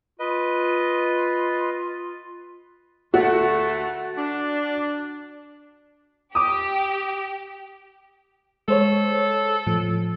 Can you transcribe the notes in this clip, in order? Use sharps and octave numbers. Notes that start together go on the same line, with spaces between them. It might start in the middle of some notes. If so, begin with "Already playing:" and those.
F4 B4 D#5
D2 A3 F#4
D4
G4 D6 D#6
G#3 A4 C5 C#5
A2 F3